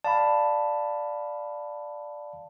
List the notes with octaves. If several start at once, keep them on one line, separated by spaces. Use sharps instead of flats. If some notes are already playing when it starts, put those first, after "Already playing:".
D5 F5 A5 B5